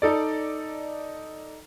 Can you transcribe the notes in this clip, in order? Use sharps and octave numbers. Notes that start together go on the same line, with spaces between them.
D#4 A4 D5